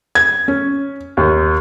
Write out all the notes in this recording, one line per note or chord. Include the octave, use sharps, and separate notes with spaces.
G#6
C#4
D#2